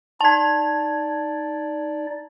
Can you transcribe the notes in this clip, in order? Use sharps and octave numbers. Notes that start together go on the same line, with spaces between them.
D#4 D5 A5 G#6